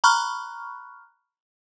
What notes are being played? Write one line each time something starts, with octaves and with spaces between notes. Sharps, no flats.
A#5 B5 C#6 F6 F#6